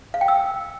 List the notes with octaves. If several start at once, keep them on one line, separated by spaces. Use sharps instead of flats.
F5
G5
E6